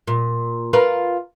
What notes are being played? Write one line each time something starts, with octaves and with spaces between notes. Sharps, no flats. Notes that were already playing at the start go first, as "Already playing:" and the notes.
A#2
F4 A#4 B4